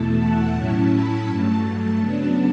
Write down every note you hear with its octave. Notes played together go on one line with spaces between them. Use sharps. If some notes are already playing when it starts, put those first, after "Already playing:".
Already playing: E2 B2 A3 E4 A5
F#5
A2 F#3 C#4 E4 A5
B5
G2 F#3 A3 A5
C#3 F#3 B3 D4